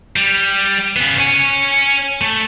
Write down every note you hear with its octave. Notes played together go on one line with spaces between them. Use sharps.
G3
C#3 B3
C#5 G#5
A3